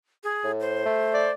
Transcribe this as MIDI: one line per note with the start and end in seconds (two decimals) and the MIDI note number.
0.24 0.52 68
0.44 0.85 45
0.60 1.31 72
0.85 1.31 57
1.14 1.33 74